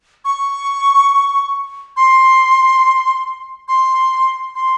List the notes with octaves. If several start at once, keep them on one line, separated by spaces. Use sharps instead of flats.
C#6
C6
C6
C6